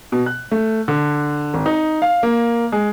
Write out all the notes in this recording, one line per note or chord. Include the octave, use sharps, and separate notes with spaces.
B2
F#6
A3
D3
G#1
D#4
F5
A#3
G#3